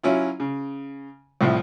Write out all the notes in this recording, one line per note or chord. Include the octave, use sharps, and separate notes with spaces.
F#3 C#4 E4 F4
C#3
C2 A2 C3 F3